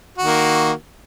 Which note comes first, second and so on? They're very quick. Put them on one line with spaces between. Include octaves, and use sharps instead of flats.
F#4 D#3 A#3